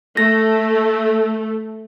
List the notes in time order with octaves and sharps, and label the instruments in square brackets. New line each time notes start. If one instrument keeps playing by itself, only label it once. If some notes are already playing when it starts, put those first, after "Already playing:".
[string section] A3 [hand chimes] A#6